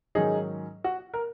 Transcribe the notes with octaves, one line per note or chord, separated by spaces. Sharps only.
G#2 D#3 F#3 C#4 D#4 G#4
F#4
A#4